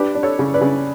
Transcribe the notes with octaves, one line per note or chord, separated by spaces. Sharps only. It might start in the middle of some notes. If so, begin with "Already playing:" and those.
Already playing: D4 G4 B4
D4
A4 C#5
C#3
B4 D5
C#3